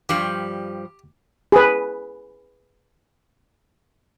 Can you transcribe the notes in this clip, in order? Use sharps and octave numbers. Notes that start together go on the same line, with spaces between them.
G2 F3 G3 G4
G#4 B4